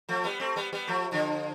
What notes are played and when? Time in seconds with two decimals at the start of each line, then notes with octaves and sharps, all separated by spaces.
0.09 F3 A3
0.24 G3 B3
0.40 A3 C4
0.56 G3 B3
0.73 G3 B3
0.87 F3 A3
1.12 D3 F3